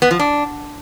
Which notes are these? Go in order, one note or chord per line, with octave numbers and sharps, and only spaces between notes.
B3
F3
D4